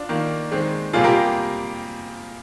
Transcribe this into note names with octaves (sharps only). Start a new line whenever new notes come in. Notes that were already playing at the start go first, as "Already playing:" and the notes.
Already playing: D4 F4
D#3 A#3
D#3 G#3 C4
C3 G3 A#3 F4 G#4
G4 A#4